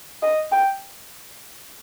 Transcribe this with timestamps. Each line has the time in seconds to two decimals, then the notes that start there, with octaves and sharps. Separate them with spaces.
0.22 D#5
0.52 G5